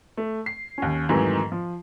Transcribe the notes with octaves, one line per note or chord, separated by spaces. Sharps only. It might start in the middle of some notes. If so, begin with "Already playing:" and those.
A3
C7
D#2 C#4
F2 G#2 D#3 E3 F#3 A3
F3